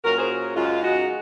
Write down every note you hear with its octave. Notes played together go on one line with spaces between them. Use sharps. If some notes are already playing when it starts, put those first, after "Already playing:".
A#2 F#3 C#4 F#4 A#4
G#4 C5
F#2 C#3 G#3 C#4 F4
D#4 F#4